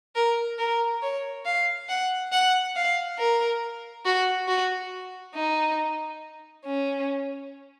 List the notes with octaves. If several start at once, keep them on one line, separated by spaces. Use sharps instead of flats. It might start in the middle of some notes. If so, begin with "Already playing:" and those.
A#4
A#4
C#5
F5
F#5
F#5
F5
A#4
F#4
F#4
D#4
C#4